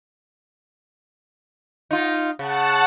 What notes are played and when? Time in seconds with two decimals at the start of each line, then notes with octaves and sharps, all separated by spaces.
1.91 D#4 F4
2.39 C#3 F#5 A5